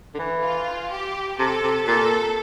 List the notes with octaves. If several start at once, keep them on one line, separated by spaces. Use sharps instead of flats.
D3
E3
F4
G4
C3 A4
C3
A#2 A4